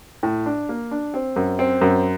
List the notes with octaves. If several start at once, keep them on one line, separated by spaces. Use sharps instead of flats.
A2
D4
A#3
D4
C4
F#2
C4
F#2